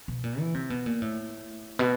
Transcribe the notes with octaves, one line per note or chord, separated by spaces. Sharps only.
B2
A#2
E3
C3
B2
A#2
A2
B2